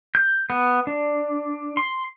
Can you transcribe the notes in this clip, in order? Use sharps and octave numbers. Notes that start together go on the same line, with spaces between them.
G6
B3
D4
C6